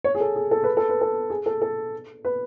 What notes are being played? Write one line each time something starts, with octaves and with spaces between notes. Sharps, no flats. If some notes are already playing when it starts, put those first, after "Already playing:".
C#5
G#4
A4
G#4
A4
B4
A4
B4
A4
G#4
A4
A4
B4